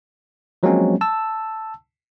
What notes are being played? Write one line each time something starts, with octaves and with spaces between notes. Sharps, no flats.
F3 F#3 G#3 A#3 C4 C#4
A5 E6